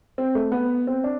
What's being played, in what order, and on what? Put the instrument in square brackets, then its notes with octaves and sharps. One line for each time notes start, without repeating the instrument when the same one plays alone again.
[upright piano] C4
A3
B3
C4
D4